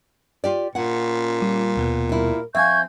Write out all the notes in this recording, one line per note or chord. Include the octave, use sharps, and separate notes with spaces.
F4 G4 D5
A#2 C#4 F#5
G3 F4
D#2 B2 B3
G3 E4 A#4
F3 C4 E5 F5 G#5 C#6 G6 G#6